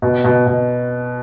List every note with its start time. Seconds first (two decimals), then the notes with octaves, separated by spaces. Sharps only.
0.02 B2
0.24 B2
0.46 B2